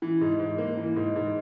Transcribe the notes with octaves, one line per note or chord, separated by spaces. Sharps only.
E3
G#2
G#2
A#3
E3
G#2
G#2